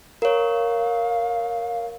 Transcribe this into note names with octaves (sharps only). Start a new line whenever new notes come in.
A#4 C#5 F5